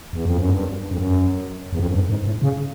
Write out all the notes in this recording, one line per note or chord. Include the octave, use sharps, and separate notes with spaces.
E2
F2
F#2
G2
F2
F#2
E2
F2
F#2
G2
G#2
A2
C#3